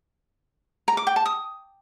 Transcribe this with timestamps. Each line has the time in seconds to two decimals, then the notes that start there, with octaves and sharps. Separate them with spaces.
0.88 A#5
0.97 D6
1.07 G5
1.16 A5
1.26 D#6